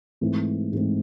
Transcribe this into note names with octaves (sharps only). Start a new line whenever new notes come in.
G#2 E3 A3 C4
G#2 E3 A3 C4